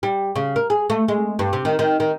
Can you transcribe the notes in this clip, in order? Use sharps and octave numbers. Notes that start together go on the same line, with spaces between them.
G3
C#3
A#4
G#4
A3
G#3
G2
C3
D#3
D#3
D#3